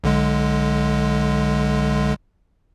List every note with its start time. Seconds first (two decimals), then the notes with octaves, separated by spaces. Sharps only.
0.04 B1 D3 G#3